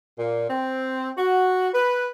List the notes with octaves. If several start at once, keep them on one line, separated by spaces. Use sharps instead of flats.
A#2
C4
F#4
B4